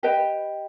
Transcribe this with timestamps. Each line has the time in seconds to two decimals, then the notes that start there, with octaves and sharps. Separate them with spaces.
0.03 G4 B4 D#5 G5